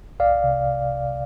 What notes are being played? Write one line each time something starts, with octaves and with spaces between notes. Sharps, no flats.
C2 D5 F5
C3